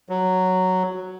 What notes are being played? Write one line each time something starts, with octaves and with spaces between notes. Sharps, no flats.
F#3